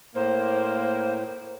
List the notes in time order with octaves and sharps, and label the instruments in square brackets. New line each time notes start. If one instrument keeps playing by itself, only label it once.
[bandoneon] A2 [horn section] A#3 [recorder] C5